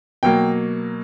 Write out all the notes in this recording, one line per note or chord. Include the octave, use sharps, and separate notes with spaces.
B2 F#3 A#3 G5